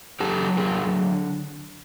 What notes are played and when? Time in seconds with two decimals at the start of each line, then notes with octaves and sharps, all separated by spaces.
0.20 F#3 G4 A4
0.57 D3 G#4 A#4